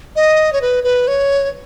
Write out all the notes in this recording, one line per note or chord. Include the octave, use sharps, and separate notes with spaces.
D#5
C#5
B4
B4
C#5